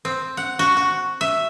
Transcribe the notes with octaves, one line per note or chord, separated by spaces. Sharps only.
C4
F#5
F#4
F#4
E5